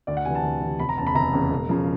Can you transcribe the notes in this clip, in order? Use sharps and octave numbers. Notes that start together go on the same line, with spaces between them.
D2 D5
F#5
C3 E3 G#5
A5
D2
C3 E3
F1 B5
A#5
E2 C#3 A5
B5
F1 A#5
E2 C#3
E1
C#3 F3